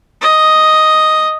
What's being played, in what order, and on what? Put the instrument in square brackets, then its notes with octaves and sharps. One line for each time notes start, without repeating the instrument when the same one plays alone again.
[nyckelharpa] D#5